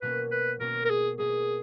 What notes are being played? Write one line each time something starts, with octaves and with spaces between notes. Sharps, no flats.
B2 A#3 C#4 B4
B4
B2 A#3 C#4 A#4
A#4
G#4
B2 A#3 C#4 G#4